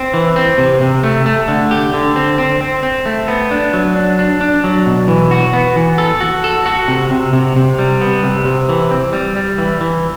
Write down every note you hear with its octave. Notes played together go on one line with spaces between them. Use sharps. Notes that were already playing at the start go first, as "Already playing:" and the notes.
Already playing: C4
E3
C4
C3
C3
A3
A3
D3
G4
D3
C4
C4
C4
C4
A3
B3
D4
F#3
D4
D4
D4
F#3
B2
E3
F#4
B3
E3
A4
F#4
A4
F#4
C3
C3
C3
C3
G3
B3
C3
C3
E3
C4
G3
G3
E3
E3